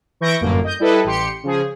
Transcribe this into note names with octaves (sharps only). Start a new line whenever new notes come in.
E3 E4 C#6 G6 A#6 D7
G1 F#2 A2 A#3
D#5 G6
G3 E4 A4 B4 D#5
A1 G4 C6 C#7
C#3 F3 G#4